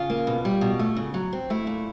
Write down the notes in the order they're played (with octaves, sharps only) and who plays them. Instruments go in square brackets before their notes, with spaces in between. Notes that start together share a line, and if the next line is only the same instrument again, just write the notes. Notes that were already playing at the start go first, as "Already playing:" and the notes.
Already playing: [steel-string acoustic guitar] C#3 F4
A#3
B2
G3
B2
A3
C#3
F#3
C4
A3 E4
A#2